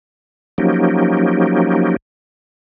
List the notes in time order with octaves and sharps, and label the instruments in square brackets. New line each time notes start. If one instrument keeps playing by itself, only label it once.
[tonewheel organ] F3 F#3 A#3 C#4 D#4 G4